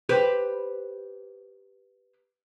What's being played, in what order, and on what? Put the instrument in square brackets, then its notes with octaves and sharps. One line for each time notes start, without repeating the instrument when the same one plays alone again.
[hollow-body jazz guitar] G4 B4 C5